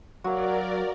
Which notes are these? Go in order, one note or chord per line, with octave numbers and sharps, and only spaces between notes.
F#3 A#3 F#4 A#4 D5